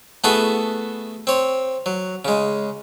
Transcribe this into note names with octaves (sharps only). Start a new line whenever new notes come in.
A3 B3 E4 F#4 G#4 A4
C4 C#5
F#3
C#3 G#3